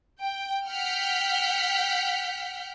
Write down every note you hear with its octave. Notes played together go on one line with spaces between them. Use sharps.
G5
F#5 G5 F6 G6 B6